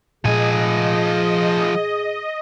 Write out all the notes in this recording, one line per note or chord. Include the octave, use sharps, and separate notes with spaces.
A#2 F3 G#3 G#4 D#5 G#5